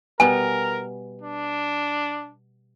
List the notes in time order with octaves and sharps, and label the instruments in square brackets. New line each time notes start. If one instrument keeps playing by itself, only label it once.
[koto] B2 G3 B3 [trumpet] A#4 [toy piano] G#5
[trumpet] D4